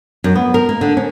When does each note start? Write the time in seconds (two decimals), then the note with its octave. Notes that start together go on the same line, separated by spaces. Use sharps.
0.24 F#2
0.35 B3
0.54 A#4
0.69 A#3
0.81 D3
0.97 C#4